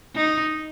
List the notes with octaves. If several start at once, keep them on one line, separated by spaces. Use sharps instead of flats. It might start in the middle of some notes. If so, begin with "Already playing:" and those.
D#4